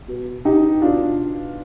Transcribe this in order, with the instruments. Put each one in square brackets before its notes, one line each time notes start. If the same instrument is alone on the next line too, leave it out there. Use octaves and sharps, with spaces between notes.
[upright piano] B2
D#4 G4
B2 D4 F4